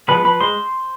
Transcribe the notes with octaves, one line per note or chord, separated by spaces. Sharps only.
F3 G#3 B3 B4 B5
F3 B4 B5
G#3 C5 C6